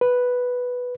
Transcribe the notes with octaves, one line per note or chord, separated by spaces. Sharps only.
B4